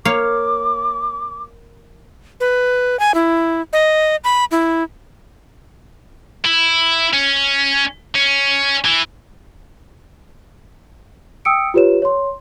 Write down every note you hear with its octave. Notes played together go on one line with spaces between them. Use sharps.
A#3 C#5 F5 D6
B4
G#5
E4
D#5
B5
E4
E4
C#4
C#4
E3
G5 D#6 E6 C#7 D7
F4 G4 B4 C#5 E7
C#5 C6